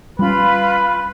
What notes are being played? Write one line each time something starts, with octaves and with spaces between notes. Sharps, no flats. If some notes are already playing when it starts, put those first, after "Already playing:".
G3 C#4 F4 B4 B5